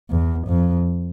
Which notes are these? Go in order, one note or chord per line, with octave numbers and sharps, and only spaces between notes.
E2
F2